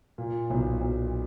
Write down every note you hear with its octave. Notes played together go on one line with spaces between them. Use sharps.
A#2
B1
B1